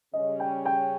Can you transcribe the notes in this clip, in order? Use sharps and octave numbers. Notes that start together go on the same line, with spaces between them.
C#3 G3 C#4 D#5
G5
G5